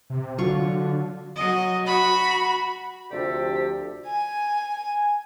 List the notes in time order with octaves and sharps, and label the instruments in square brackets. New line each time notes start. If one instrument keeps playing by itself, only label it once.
[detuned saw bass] C3
[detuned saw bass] D3 [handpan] F#3 F#4 [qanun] F4 C#6
[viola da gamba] F#3 D#5
[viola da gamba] F#4 [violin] B5
[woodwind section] D2 C3 F3 G4 A4 D5
[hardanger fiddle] G#5